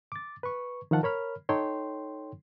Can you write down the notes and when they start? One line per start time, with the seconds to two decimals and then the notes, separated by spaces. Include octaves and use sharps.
0.12 D6 A6
0.43 B4 C#6
0.91 D#3 F3 F5 F#5 A5
1.03 A#4 C#5 B5 F6
1.49 D#4 A4 C#5 G5 C6